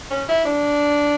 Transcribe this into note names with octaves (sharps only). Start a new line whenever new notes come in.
C#4
E4
D4